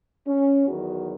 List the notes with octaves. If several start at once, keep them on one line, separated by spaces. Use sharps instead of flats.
C#4
E2 D#3 F#3 F#4